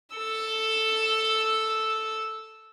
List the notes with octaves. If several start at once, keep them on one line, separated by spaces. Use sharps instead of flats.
A4 E6